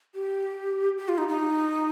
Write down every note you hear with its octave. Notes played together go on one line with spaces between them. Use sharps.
G4
G4
F4
D#4
D#4